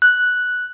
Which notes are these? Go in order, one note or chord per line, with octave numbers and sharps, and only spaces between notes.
F#6